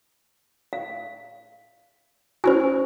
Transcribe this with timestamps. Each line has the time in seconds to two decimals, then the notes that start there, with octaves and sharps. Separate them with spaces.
0.73 F5
2.44 C#4 E4 F#4 C5 G#5